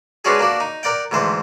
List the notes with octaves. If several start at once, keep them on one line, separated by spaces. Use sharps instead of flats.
G#3 B3 C#4 D4 F#4 G#4
A#3 D4 F#4
D#4
A#4 D5 F#5 G5
D2 G#2 E3 C5